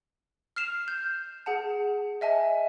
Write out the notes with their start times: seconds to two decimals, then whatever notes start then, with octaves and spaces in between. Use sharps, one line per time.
0.56 F6 C7 E7 F7
0.88 G6
1.46 G#4 F#5 A5
2.21 D#5 E5 G#5 A5